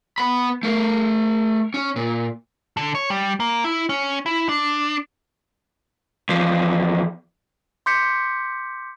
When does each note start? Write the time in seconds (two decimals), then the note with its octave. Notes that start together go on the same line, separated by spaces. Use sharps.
0.18 B3 B5
0.63 A3 A#4
1.74 C#4
1.96 A#2
2.77 D3
2.95 C#5
3.10 G3
3.40 A#3
3.64 E4
3.89 C#4
4.26 E4
4.49 D4
6.29 E2 F3
7.86 C6 D6 G6 B6 C#7